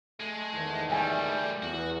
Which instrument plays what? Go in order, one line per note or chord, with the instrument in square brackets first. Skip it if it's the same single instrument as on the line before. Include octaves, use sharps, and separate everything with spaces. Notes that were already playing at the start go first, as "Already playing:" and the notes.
[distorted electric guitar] G#3 [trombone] A3
[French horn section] E2 D#3
[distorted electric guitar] C#2 G3 [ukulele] G5 G#5
[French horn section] E2 [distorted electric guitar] F#4